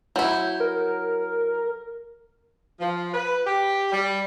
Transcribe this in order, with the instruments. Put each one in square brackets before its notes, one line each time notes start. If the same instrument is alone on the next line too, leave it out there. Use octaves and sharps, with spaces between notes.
[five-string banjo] F#3 E4 [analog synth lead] G6
[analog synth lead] A#4
[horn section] F3
B4
G4
G3